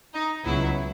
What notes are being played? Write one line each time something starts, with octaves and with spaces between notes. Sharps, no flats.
D#4
C#2 B2 F#3 E4